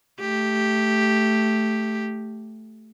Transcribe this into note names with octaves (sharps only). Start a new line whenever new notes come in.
A3 G4